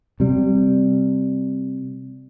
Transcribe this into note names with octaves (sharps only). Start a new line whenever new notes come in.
C3 G3